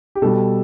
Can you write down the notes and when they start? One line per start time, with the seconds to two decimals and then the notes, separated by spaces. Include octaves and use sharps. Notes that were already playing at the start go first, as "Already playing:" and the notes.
0.15 G4
0.22 B2 G3 A4